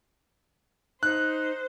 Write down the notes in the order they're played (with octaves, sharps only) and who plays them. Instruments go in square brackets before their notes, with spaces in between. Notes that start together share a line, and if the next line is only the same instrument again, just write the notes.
[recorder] D#4 [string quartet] C5 [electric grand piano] F#6